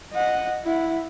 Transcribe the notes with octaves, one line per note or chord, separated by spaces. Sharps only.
D#5 F#5
E4 F#5